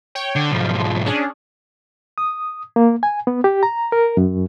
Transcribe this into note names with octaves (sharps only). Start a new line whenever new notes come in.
C#5 G5
D3
B1 G#2 F3
C#4 D4 G#4
D#6
A#3
G#5
B3
G4
A#5
A#4
F#2